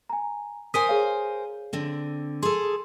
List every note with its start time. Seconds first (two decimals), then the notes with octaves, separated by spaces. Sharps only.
0.10 G#5 A#5
0.74 A#4 C5 G#5 D#6 B6 D#7
0.89 G#4 C#5 F5
1.73 D3 C4
2.43 G#4 A4 C6